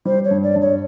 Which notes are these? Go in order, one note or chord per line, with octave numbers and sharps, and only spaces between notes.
G3 C5
C#5
G2
D5
G2
C#5